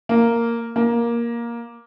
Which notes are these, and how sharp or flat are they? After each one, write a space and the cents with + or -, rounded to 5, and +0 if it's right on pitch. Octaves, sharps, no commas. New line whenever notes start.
A#3 -5
A#3 +10